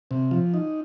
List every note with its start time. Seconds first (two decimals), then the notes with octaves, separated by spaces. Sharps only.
0.11 C3
0.31 F3
0.54 D#4